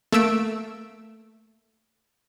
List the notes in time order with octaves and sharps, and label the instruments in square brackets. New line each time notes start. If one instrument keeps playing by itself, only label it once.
[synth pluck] A3 A#3 E6 D7